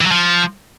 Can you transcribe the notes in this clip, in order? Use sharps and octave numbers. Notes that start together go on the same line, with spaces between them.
E3
F#3
F3